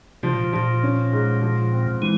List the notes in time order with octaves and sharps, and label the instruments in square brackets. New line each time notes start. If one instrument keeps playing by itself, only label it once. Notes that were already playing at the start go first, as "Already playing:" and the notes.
[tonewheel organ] C3 [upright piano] F3
[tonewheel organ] A#2
[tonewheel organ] A#2 [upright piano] F3
[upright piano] C#4
G#2
F3
C4
[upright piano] E3 [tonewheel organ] G#3